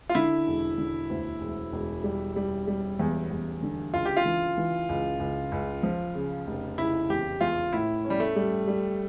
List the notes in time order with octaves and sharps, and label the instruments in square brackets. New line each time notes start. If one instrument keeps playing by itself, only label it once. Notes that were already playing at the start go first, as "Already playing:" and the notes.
[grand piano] F4
[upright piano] D3 [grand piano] E4
[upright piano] E1
D3
D2
E1
E1
G3
G3
G3
E2
E2
D3
[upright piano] C#2 [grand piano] F4
[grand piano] G4
F4
[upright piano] E3
E3
C#2
C#2
C#2
F3
C#3
F1
[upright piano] C#3 [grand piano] E4
[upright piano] E2 [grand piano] G4
[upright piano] E2 [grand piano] F4
[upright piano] A2 [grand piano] E4
[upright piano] C#4
[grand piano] G3
A3
[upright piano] G3
G3